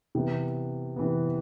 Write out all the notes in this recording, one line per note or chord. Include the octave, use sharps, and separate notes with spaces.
C3 E3 B3
C3 E3 B3